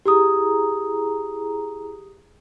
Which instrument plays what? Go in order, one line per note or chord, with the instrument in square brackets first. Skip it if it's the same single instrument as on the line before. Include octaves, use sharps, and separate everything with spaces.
[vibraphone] E4 G#4 A#5 [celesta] G4 D#6